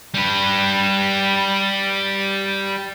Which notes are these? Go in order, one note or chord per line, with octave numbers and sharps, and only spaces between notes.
G3 B4